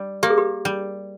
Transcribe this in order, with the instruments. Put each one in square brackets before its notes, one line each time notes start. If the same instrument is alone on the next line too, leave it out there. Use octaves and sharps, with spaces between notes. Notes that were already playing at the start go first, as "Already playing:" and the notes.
Already playing: [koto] G3
[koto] A#3 [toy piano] G4
[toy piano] G#4
G4
[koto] G3